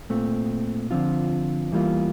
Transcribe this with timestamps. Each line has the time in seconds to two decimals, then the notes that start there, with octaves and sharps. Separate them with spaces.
0.10 A#2 A3 C4
0.91 D3 F3 C4 F4
1.71 E2 E3 G3 A#3 F4